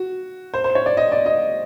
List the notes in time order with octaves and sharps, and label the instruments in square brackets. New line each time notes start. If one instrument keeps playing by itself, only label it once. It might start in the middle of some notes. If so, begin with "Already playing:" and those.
Already playing: [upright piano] F#4
C5
C5
C#5
D5
D#5
D5
D#5